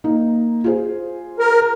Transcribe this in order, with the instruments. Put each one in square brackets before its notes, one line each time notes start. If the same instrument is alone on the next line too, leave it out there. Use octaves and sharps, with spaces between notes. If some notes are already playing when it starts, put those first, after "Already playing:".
[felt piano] A#3 D#4
F4 G#4 C5
[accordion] A#4